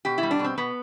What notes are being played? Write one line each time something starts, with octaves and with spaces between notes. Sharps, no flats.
B2 G4
E4
G3
D4
B2
C4
B2 B3